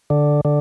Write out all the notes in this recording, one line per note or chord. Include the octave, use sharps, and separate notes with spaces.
D3
D3